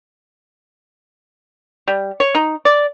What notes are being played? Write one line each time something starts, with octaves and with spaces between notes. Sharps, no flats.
G3
C#5
D#4
D5